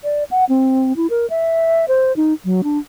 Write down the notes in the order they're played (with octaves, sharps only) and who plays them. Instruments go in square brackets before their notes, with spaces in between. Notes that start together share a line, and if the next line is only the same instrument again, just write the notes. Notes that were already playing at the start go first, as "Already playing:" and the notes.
[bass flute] D5
F#5
C4
E4
A#4
E5
C5
D#4
F#3
D4